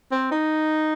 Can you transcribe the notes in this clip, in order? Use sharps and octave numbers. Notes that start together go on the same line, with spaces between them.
C4
D#4